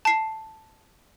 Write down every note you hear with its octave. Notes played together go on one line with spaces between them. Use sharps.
A5 C7